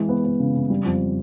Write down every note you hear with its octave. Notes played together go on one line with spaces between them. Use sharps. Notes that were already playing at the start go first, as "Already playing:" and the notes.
Already playing: E3 G#3
B3
B3
C#3
C#3
G3
F2